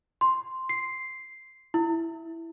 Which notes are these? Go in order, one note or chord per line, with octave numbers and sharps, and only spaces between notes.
C6
C7
E4